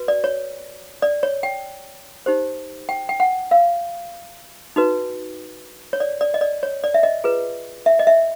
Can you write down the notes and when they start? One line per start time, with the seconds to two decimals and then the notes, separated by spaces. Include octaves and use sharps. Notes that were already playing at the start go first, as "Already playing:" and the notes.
Already playing: F#4 B4
0.08 D5
0.24 C#5
1.02 D5
1.23 C#5
1.43 G5
2.26 D#4 G4 C5
2.89 G5
3.09 G5
3.20 F#5
3.51 F5
4.76 D#4 F#4 B4
5.93 C#5
6.00 D5
6.21 D5
6.34 D#5
6.41 D5
6.63 C#5
6.84 D5
6.94 E5
7.03 D#5
7.24 F4 G#4 B4
7.86 E5
7.99 D#5
8.07 E5